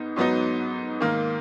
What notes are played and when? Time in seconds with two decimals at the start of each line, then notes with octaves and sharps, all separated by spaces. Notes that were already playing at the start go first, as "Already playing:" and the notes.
Already playing: G#2 B3 D#4
0.16 G#2 F#3 B3 D#4
1.00 G#2 D#3 A#3